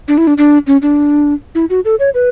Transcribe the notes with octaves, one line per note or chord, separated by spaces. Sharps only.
D4
E4
D4
D4
C#4
D4
E4
F#4
A4
C#5
B4